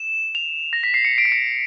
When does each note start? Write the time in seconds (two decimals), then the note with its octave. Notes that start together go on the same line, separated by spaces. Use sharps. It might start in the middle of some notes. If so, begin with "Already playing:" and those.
Already playing: E7
0.35 F7
0.73 A#6
0.83 B6
0.94 C7
1.05 C#7
1.18 D7
1.25 C7
1.32 C#7